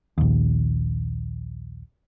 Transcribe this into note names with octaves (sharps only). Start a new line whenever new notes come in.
A#1 D#2